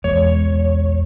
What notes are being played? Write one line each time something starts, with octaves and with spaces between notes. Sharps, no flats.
B1 E2 G#3 C#5